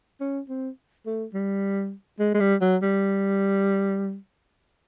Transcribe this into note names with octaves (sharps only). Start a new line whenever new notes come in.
C#4
C4
A3
G3
G#3
G#3
G3
F#3
G3